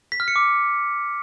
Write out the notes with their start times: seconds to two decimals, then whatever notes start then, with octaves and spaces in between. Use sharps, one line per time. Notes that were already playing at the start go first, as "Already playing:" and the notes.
0.12 B6
0.20 F6
0.28 C#7
0.36 D6